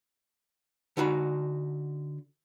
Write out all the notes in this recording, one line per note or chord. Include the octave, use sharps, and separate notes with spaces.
D3 D#4 F#4 B5